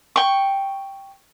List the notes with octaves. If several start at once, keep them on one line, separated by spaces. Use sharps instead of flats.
G5 C#6